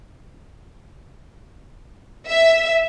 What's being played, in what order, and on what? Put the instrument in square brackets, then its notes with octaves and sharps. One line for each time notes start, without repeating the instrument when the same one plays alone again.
[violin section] E5